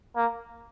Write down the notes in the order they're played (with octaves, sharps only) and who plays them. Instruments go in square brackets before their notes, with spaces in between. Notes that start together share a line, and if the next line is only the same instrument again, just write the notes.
[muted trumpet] A#3